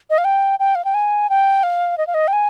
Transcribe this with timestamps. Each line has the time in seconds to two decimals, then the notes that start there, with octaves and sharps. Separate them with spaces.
0.10 D#5
0.18 F5
0.25 G5
0.60 G5
0.75 F5
0.85 G5
0.94 G#5
1.30 G5
1.63 F5
1.98 D#5
2.07 F5
2.14 D#5
2.28 G5
2.33 G#5